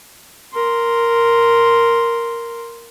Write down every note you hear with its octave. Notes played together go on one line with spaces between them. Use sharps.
A#4 C6